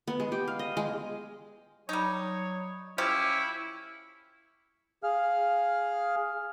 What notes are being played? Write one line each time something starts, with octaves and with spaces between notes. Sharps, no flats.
B3
G#3
G4
F5
D#5
G#3
F#3 G3 D#4 C#5
F3 C#4 E4 G4 C#6
G#4 F5 F6